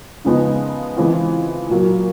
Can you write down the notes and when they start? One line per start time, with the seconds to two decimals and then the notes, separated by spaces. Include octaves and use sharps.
0.25 C#3 F3 G#3 B3 D#4
0.97 E3 G#3 C4 F4
1.70 A#2 F#3 A#3